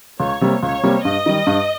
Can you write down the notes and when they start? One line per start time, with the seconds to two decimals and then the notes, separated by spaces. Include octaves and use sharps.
0.20 C#2 C#5
0.41 C3 G3 A#3
0.62 C#2 C#5
0.83 C3 G3 A#3
1.04 G2 D#5
1.26 D#3 G3
1.47 G2